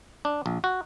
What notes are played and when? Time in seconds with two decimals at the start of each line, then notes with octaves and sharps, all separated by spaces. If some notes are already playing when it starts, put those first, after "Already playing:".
0.25 D4
0.46 A#1
0.64 F#4